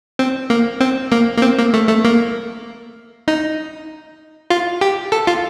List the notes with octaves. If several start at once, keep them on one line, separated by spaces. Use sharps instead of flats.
C4
A#3
C4
A#3
A#3
C4
A#3
A3
A3
A#3
D#4
F4
G4
A4
F4